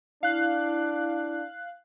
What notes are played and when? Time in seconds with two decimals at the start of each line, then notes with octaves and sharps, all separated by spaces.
0.23 D4 E4 F5 F#6